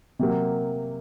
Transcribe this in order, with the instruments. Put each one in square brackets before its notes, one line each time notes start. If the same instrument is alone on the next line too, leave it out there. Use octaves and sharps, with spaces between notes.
[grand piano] C3 F#3 A#3